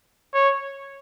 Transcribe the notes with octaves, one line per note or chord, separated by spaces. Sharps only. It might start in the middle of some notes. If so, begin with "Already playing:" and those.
C#5